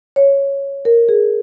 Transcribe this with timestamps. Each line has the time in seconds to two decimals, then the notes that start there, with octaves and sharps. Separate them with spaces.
0.16 C#5
0.85 A#4
1.09 G#4